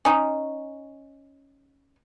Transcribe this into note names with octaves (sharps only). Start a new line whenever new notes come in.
C#4 D#4